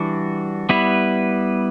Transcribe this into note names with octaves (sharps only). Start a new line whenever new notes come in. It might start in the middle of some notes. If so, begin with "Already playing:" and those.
Already playing: E3 G3 D4 F#4
G3 B3 E4 B4